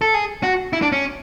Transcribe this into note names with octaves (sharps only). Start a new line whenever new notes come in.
A4
G#4
F#4
E4
D4
C#4